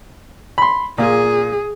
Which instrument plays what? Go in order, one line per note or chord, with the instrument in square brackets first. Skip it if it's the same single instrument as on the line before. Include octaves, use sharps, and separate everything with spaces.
[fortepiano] B5 C6
[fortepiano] A#2 F4 [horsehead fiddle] G#4